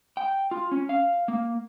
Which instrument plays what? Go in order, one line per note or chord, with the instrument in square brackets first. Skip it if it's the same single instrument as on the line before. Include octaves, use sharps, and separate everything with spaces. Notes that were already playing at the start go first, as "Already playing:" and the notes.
[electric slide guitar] G5
F4
C#4
F5
A#3